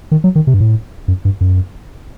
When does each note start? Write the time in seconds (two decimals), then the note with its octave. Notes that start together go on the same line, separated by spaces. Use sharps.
0.11 D#3
0.24 F#3
0.35 D#3
0.47 C3
0.54 G2
0.60 A2
1.08 F#2
1.25 G2
1.41 F#2